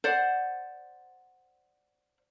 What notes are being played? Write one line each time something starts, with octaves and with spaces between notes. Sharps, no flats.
C5 D5 F#5